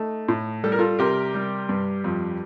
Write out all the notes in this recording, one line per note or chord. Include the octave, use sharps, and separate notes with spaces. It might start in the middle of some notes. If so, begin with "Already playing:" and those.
Already playing: A3 D#4
A2
G3 A4
A#4
F4 A4
C3 G4 A#4
G3
G2
F2